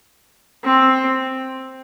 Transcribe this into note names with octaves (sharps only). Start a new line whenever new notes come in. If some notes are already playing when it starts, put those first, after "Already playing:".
C4